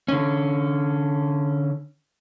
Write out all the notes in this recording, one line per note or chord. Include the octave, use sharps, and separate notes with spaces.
D3 C#4